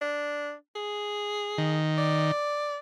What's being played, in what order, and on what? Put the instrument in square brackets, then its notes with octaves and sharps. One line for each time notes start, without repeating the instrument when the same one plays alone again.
[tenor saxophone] D4
G#4
[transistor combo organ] D#3
[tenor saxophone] D5